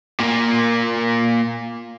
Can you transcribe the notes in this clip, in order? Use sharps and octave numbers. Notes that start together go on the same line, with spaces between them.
A#2 A#3